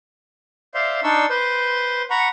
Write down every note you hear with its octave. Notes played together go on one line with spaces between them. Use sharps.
C5 D5 E5 F5 C6
D4 D#4 D5 C6 C#6 E6
B4 C5 C6
F#5 A#5 B5 C#6